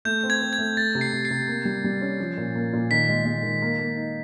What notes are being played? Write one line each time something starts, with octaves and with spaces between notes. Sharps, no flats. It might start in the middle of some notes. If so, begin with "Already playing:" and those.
A3 G6
C4
G#6
C4
G#6
A3
A3 A6
C3
C7
C3
C7
C3
A#3
G3
G3
C#4
F3
A#2
A#3
A#2
D#3 B6
G#3
G#3
D#3
A#3
A#3
D#4